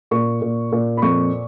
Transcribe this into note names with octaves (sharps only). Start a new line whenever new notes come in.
A#2 C#6
A#2
A#2
B5
F2 C#6